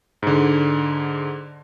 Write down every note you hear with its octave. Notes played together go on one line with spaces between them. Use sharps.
G#2 D3